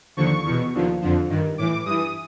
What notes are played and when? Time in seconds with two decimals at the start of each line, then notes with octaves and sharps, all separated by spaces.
0.17 D#2 D3 F3 C#6
0.45 E2
0.50 B2
0.73 D#2 D3 F3
1.01 F2 D3 F3
1.29 G2 D#3
1.58 A2 E3 D6
1.85 G2 E3 D#6